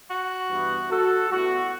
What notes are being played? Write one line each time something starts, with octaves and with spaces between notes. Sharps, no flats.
F#4
G2 E3 B3 E4
F#4 A4
A2 G3 B3 E4 F#4